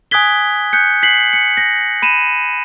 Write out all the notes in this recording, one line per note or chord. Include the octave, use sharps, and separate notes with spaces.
G#5 D#6 F#6 G#6 B6 G7
F#6 G6 C#7
B6 C7 F#7
C#7
A#6
B5 D#7 E7